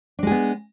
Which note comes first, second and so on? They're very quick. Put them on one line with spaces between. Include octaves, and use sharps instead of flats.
D4 G#3 G#4 B3